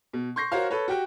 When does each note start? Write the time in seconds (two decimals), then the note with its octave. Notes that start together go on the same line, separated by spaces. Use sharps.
0.13 B2
0.36 C6 C#6 G6 A#6 C7
0.52 F#4 A#4 C5 C#5 F5
0.70 A4 B4 C#5
0.88 F#4 G4 G5